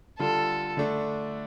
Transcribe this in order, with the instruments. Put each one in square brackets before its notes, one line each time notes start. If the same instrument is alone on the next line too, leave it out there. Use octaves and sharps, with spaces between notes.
[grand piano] D3 G3 F4 [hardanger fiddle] A4
[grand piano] D3 A3 D4